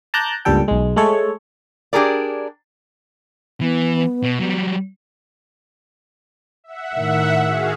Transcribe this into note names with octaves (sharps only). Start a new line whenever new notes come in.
A5 A#5 D6 F#6 G6
C#2 G2 A#2 G3 A4 G5
B1 G#3
G#3 A3 A4 C#5
D4 G4 G#4 A#4 D5
E3 B3
B2
F#3 G3
E5 F#5
A2 D#3
F#4 G#4 F5